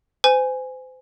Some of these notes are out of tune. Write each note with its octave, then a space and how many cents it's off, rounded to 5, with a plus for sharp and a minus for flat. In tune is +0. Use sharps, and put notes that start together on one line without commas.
C5 -35 G#5 -5